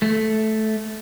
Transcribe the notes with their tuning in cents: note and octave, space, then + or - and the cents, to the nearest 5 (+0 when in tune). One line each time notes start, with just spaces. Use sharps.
A3 -10